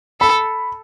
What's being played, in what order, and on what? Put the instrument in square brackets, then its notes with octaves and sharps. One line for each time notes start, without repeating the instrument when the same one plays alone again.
[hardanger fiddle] A4 [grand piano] B5